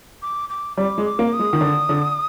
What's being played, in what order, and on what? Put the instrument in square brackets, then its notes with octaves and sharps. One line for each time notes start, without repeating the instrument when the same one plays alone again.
[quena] D6
D6
[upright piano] G3 [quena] D6
[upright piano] G#3
[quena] D6
[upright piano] A#3
[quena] D#6
[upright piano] G#3
D#3
D3
D3